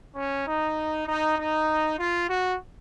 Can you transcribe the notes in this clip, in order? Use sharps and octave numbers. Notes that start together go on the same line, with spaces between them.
C#4
D#4
D#4
D#4
F4
F#4